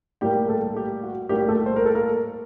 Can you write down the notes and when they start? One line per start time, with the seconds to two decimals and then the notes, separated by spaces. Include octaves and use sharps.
0.21 A2 G3 A#3 G4 G5
0.48 A3 A4
0.76 G4
1.04 F#4
1.29 A2 G3 A#3 G4
1.48 A3 A4
1.66 C5
1.76 A#4
1.85 A4
1.94 A#3 A#4